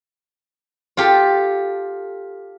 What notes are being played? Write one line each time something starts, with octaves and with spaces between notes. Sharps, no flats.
F4 G4 A4